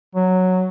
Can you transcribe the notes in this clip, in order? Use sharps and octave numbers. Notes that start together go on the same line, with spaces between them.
F#3